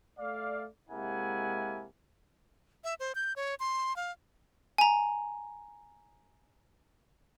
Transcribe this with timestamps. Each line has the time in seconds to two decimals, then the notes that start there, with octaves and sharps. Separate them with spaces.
0.19 A3 D5 F5
0.90 C3 G#3 A#3 E4 F#5 G#5
2.84 E5
3.00 C5
3.15 G6
3.36 C#5
3.60 C6
3.96 F5
4.78 G#5 A#5